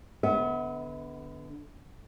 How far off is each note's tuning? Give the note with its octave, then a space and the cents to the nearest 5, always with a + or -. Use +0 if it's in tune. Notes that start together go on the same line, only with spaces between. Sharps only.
D3 -15 B3 +0 E5 -45